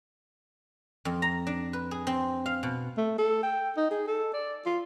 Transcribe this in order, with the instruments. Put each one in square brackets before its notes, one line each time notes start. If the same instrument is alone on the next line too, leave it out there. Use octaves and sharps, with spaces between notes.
[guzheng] F2
A#5
D4
B4
G#4
C4
F5
B2
[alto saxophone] A3
A4
G5
D#4
G#4
A4
D5
F4